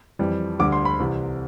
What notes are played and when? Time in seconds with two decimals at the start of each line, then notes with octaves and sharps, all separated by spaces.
0.19 F2 E3 G3
0.59 D2 D3 G3 D6
0.72 C6
0.85 B5
1.00 C2 C3 E3